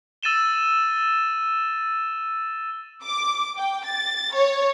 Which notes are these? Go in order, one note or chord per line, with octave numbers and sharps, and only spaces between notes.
E6 A6 D#7 E7 G7
D6
G5
A6
C#5